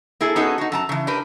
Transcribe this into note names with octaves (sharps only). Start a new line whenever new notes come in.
A#3 E4 G#4 A4
B3 C#4 D#4 F#4 G#4 A4
D#4 F#4
F#2 A5 A#5
C#3 E3
D4 G4 A#4 B4